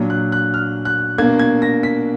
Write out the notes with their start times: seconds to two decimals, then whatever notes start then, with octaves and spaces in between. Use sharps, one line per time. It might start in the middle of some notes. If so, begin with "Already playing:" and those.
Already playing: A#2 F#3 D4
0.10 F#6
0.32 F#6
0.54 F6
0.85 F#6
1.18 B2 A#3 D4 G#6
1.39 G#6
1.62 A#6
1.83 B6